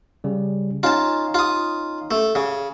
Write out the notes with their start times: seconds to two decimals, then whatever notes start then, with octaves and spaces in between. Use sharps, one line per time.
0.24 C#3 G3
0.83 C#4 D#4 F4 A5
1.34 F4 D#6
2.11 A3
2.35 C#3